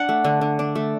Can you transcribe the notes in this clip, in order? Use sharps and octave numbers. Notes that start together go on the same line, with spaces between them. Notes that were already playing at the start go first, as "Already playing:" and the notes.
Already playing: D4 F#5
A3
D3
D3
D4
A3